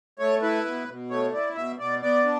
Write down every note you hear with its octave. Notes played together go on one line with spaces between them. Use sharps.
A3 C#5
E4 B4
B2
B2
A3 C#5
E4 D5
B2 E5
B2 D5
B3 D5
D4